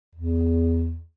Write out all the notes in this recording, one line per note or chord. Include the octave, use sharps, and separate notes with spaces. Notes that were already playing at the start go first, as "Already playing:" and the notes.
E2